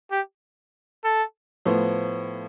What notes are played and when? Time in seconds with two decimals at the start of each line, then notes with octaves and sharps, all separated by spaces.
0.11 G4
1.04 A4
1.65 A2 F3 B3 F4 C5